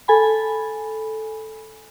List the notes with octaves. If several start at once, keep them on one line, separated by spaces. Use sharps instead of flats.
A4 G#5 B5